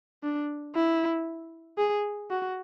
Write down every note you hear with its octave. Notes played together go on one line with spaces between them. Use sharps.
D4
E4
G#4
F#4